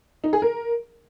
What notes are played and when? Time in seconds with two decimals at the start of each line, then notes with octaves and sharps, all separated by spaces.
0.24 D#4
0.33 G#4
0.42 A#4